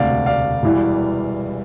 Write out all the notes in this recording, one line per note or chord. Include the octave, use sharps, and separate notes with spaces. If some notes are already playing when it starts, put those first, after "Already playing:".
Already playing: E1 D2 C3 D5 F5
D5 F5
E1 E2 E3 G3